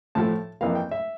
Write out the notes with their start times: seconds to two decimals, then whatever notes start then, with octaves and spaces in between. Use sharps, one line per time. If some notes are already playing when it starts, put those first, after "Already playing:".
0.15 A2 F3 A3 A5
0.61 F2 E3 A#3 F5
0.75 G5
0.91 E5